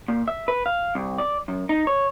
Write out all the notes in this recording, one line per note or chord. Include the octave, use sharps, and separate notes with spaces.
A#2
E5
B4
F5
C2
D5
F#2
D#4
C#5